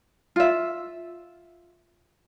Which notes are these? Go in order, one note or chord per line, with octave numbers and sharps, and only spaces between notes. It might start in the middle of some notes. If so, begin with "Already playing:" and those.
F4 E5